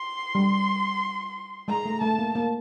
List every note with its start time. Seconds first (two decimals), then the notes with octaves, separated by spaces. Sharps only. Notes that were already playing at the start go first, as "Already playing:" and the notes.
Already playing: C6
0.35 G3
1.68 G#3 A#5
1.86 A3
2.01 A3 A5
2.19 A#3
2.35 A#3